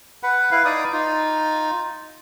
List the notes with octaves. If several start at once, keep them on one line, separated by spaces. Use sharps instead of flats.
B4 F#5 B5
E4 B4 F5
D#4 D5 D#6
D#4 F4